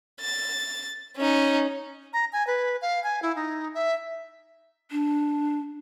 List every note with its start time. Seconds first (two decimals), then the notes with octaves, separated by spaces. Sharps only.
0.21 A6
1.16 C#4 D#4
2.13 A#5
2.33 G#5
2.47 B4
2.82 F5
3.04 G#5
3.22 E4
3.36 D#4
3.75 E5
4.91 D4